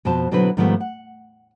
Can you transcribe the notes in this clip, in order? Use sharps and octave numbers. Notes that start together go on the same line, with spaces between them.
F2 B2 C5 A5
B2 D3 F#3 C4 E4 B4
G#2 D#3 F3 G3 A3 B3
F#5